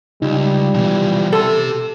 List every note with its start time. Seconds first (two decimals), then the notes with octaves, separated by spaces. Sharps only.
0.22 C#2 G3 D#4
0.74 B2 E3 F3
1.33 G4 A4 C6